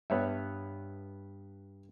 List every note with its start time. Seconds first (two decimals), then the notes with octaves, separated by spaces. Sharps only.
0.10 G2 B3 C#5 E5